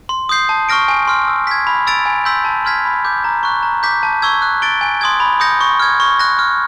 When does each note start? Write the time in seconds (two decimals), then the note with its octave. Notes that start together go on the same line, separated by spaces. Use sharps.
0.09 C6
0.29 D#6 G6 C7
0.49 A5
0.69 C#6 F6 A#6 D7
0.88 G#5
1.07 C6 F6
1.28 E6
1.47 G#6 B6
1.67 B5
1.87 E6 A6 D7 F7
2.06 G#5
2.25 C6 E6 G6 B6
2.45 A5
2.65 C6 F6 G#6 B6
2.85 B5
3.05 D6 G6
3.24 A#5
3.43 C#6 F#6
3.63 A#5
3.83 D6 G6 B6
4.03 A5
4.22 C#6 E6 G#6
4.42 F#6
4.62 A6 D7 G7
4.81 G#5
5.01 C6 D#6 G#6
5.20 B5
5.40 D#6 G6 A#6 C#7
5.61 C#6
5.80 F6 G#6
6.00 C#6
6.19 F#6 A#6
6.39 F6